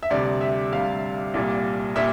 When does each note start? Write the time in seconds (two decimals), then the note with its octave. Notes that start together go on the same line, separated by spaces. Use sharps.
0.03 E5
0.10 D2 C3 G3 D5
0.41 E5
0.73 D2 C3 G3 F5
1.34 C2 A#2 G3
1.95 A#2 G3 E5